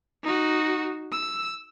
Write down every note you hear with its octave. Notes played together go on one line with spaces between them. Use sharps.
D#4 F#4
E6